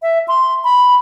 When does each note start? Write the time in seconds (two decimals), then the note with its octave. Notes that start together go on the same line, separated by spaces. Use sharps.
0.02 E5
0.28 C6
0.64 B5